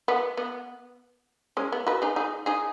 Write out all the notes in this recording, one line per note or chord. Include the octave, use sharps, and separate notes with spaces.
B3
B3
G#3 C#4
B3
F#4 B4
D#4 G#4
D#4 G#4
D#4 G#4